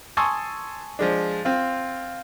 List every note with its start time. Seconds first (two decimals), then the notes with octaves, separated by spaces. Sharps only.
0.17 G#5 A5 C6 C#6 D#6 E6
0.99 F3 G#3 D4
1.45 C4 F4